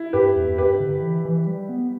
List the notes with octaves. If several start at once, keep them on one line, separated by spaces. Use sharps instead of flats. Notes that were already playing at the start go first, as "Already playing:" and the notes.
Already playing: E4
G2 G4 B4
E2
G2 G4 B4
D3
E3
E3
G3
B3